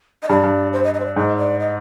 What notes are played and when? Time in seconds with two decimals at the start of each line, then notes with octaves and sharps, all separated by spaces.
0.23 D#5
0.29 G2 D5
0.43 G2
0.73 C5
0.84 D#5
0.94 D#5
1.00 C5
1.05 D5
1.16 G#2 D#5
1.37 D5
1.60 D#5